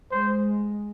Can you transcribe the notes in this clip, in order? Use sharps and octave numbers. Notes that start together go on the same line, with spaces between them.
G#3 C5